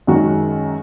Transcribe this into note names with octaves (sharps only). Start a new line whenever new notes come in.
F#2 D#3 G#3 D#4 F#4